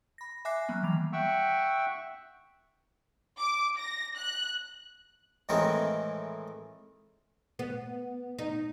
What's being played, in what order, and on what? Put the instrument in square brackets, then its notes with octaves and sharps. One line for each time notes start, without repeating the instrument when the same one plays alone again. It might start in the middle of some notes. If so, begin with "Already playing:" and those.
[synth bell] B5 A#6
E5 G#5 D6 F#6 A#6 C7
F#3 A#3 B3
D#3 E3 G3 F7
[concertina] E5 F#5 G5 C#6 E6
[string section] D6
A#6
F#6
[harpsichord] A2 D#3 E3 G#3 C4 A#4
[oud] B3
D#4